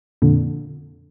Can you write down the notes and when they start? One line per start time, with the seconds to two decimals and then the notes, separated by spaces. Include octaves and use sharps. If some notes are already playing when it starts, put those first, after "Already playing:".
0.22 F2 A#2 D3